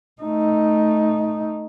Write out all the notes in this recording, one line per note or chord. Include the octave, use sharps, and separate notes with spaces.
A3 D#4